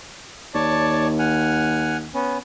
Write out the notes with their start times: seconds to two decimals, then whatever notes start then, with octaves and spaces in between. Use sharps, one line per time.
0.54 D#2 C#5 D5 A5
1.19 F#5 G#5 F6
2.14 B3 C#4